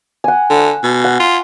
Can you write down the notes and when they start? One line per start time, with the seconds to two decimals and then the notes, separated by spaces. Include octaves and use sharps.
0.24 F#5 G#5
0.50 D3
0.84 B2
1.04 F#5
1.20 F4